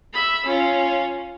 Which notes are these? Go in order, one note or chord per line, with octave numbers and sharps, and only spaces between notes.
E5 B5
C#4 F4